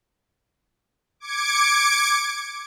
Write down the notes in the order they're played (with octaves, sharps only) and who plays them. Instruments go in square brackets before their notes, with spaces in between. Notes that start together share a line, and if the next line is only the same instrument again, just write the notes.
[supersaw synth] D6 G#6 C#7 D7